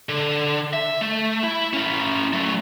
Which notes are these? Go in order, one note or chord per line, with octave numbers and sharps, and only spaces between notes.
D3
E5
A3
E4
C#4 E4
F#3 A3